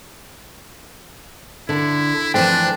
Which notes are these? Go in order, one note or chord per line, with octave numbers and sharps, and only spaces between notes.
D3 E4
E3 F3 A3 D4 C5 G5